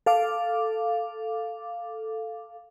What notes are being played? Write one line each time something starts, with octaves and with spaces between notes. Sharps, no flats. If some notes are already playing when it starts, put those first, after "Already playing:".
A4 F5 D6